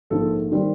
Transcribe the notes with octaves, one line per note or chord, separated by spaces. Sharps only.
A#1 G#2 F3 A#3 A4
D#3 G3 C4